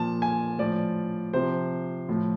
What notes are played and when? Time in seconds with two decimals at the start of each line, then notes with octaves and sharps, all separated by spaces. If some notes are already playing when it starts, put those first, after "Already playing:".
Already playing: A#2 F3 A5
0.22 G#5
0.59 A2 F3 D5
1.33 C3 F3 C5
2.09 A2 F3